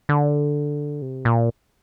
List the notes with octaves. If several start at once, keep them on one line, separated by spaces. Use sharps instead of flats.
D3
C3
A#2